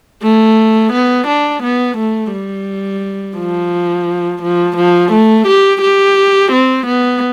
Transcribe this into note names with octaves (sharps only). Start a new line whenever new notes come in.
A3
B3
D4
B3
A3
G3
F3
F3
F3
A3
G4
G4
C4
B3